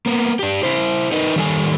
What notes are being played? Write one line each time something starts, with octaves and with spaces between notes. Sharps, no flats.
A#3 B3
D4 G4
E4 C5
D#4 A#4 B4 D#5
D#3 G3 A4 G#5